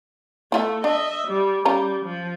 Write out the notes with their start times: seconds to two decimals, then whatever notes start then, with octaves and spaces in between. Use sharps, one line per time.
0.52 A3 E4 F4 E5
0.84 D4 D#5 E5
1.28 G3
1.65 G3 C#4 F4 A#5
2.05 F3